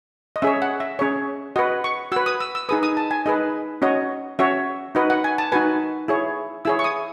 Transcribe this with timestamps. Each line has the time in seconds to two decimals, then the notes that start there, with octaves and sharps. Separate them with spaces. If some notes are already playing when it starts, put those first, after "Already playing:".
0.36 D#5
0.42 C#4 G#4 C#5 E5
0.62 F#5
0.80 E5
0.99 C#4 G#4 C#5
1.56 F#4 B4 D#5
1.84 C#6
2.12 F#4 B4 E6
2.26 D#6
2.40 E6
2.55 E6
2.69 D#4 G#4 B4 D#6
2.83 D#6
2.97 A5
3.11 G#5
3.26 D#4 G#4 B4 D#5
3.82 C#4 F#4 C#5 D#5
4.39 C#4 F#4 C#5 E5
4.95 D#4 F#4 B4 D#5
5.10 F#5
5.24 G#5
5.38 A5
5.52 D#4 F#4 B4 G#5
6.08 E4 G#4 C#5
6.65 E4 G#4 C#5 E6
6.79 C#6
6.84 D#6